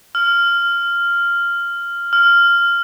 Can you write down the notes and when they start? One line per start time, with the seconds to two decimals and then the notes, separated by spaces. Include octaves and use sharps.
0.15 F6
2.13 F6